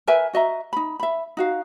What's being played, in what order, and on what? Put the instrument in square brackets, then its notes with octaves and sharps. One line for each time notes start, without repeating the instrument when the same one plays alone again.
[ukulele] A#4 B4 E5 G#5
F#4 D#5 E5 A#5
D#4 B5
E5 B5
D#4 F#4 F5